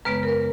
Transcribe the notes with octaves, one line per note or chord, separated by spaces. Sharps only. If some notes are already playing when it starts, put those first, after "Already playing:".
F#2 C#3 G#3 B3 B4
A#4